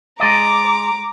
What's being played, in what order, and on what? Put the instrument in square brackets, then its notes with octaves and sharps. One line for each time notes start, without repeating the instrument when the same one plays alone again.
[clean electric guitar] G#3 D5 D#5 [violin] A#5 D6